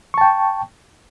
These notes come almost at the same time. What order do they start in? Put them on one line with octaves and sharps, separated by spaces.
C#6 A5 G5